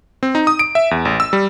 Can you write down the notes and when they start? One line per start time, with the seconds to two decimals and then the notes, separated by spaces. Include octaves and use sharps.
0.23 C4
0.35 D#4
0.47 D#6
0.59 D7
0.75 E5
0.91 E2
1.05 A1
1.20 E6
1.33 G3